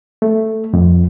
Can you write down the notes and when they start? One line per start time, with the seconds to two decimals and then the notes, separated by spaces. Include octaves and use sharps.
0.22 A3
0.74 F2